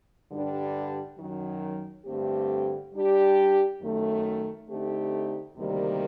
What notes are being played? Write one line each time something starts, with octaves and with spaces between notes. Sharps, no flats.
G2 D3 G3 D4 G4
F#2 D#3 F#3
G2 D3 A3 C4 G4
G3 D4 G4
F#2 D#3 A3
D3 A3 C4 D#4 G4
D2 C3 D#3 G3 A#3